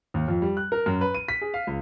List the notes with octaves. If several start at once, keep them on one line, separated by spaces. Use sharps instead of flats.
D#2
F2
G3
F#6
A#4
F#2
B4
D#7
B6
G#4
F5
C#2